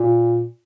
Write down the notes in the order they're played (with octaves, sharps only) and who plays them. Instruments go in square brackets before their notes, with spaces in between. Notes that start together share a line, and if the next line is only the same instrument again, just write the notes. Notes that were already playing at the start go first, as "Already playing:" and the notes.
Already playing: [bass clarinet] A#2